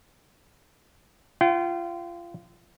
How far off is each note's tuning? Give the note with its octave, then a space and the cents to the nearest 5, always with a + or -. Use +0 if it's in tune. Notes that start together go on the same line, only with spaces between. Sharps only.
F4 -25 G5 -40